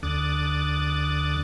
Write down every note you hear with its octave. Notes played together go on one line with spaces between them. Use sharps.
D2 D3 D6 D#6 F#6 A6